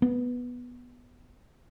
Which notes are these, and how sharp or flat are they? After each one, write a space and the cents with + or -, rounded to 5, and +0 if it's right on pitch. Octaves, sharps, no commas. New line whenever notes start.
B3 -5